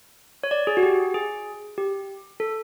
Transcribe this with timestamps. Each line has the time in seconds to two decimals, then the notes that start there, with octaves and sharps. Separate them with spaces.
0.44 C#5
0.51 D5
0.67 G#4
0.77 F#4
0.83 G4
1.14 G#4
1.78 G4
2.40 A4